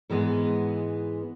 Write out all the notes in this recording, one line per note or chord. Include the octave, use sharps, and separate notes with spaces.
G#2 E3 G#3 B3